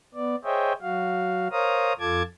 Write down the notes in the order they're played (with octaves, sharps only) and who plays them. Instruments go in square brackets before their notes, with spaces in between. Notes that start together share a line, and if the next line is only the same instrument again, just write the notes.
[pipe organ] B3 D5
G#4 C5 C#5 D#5 E5 G5
F#3 F#4 F5
A#4 C5 C#5 F5 A#5 D#6
F2 F4 A4 A5 D6 G#6